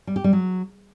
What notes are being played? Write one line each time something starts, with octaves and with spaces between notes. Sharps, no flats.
G3
G4
G3
F#3